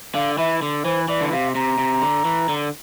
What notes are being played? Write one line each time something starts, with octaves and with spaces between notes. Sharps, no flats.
D3 F5
E3 E5
D3
E3 C5
E3 D5
D3
C3 F5
C3 A#5
C3
D3
E3
D3